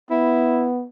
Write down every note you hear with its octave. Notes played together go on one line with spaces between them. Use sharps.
B3 E4